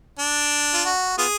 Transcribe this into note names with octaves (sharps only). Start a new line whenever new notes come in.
D4
F4
F#4
B3 F4 G#4